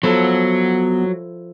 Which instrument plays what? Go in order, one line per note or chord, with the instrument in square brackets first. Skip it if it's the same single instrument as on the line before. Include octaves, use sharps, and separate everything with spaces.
[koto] F3 E4 A4 [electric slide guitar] F#3 [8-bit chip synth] B3